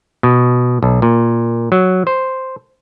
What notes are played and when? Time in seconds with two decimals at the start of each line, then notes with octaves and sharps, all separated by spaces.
0.23 B2
0.83 B1
1.02 A#2
1.72 F#3
2.07 C5